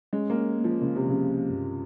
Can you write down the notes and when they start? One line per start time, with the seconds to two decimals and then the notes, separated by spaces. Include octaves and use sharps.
0.13 G#3 C#4
0.30 A#3
0.36 C#4
0.59 F3 A#3
0.81 C#3 A#3
0.96 C3
1.05 C#3 F3
1.27 C2
1.50 G2